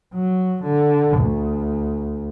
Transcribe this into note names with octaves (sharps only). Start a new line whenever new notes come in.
F#3
D3
D2